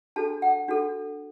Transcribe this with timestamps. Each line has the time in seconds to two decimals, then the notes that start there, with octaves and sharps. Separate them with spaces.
0.16 D4 F#4 A4 A5
0.42 F#5
0.68 D4 F#4 A4